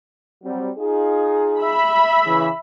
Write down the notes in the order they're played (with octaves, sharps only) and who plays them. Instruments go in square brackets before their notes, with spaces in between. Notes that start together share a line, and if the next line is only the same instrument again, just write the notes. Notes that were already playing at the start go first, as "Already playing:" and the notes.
[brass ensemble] F#3 G3 C4
D#4 F4 G#4
[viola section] E5 B5
[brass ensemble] C#3 E3